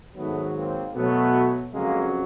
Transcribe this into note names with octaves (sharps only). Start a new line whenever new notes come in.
G#2 D#3 F#3 A3 B3
A#3 C4
B2 F#3 A3 B3
F2 C#3 F#3 G#3 A#3